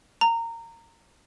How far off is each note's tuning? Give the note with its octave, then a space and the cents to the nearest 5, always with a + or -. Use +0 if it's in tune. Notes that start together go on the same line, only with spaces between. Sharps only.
A#5 -20